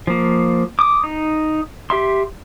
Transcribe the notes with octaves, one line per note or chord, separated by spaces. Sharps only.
F3 A#3
D6 D#6
D#4
G4 E5 C6